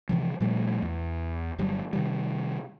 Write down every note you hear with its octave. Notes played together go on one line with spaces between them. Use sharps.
C3 E3 F3
A#2 F3 G3 A3
E2
G1 F#3 G3
C3 D#3 G3